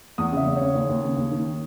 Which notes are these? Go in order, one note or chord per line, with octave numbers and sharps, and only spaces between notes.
E2 D#6
C#3 E5
E2
C#5
C#3
D#2
D#2
C#3
D#2
D#3